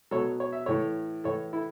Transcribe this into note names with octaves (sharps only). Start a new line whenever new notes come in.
B2 F#3 A4 C#5
C#5
E5
A2 E3 A4 C#5
A2 E3 A4 C#5
E4 A4